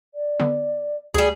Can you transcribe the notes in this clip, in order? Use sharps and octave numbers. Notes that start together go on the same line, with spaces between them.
D5
D3 B3
D2 G3 G#4